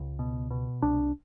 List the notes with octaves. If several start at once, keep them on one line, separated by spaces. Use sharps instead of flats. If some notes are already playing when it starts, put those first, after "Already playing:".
Already playing: C#2
B2
B2
C2 D4